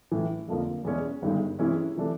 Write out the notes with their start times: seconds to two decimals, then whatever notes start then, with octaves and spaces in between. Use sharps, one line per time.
0.11 A1 A2 E3
0.48 F1 F2 D3 F3 A#3
0.84 E2 B2 G#3 C#4
1.22 G1 G2 D#3 G#3
1.59 C3 E3 G#3 C#4 E4
1.96 C3 E3 A3 D4